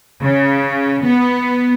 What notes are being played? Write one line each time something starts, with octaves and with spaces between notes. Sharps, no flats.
C#3
B3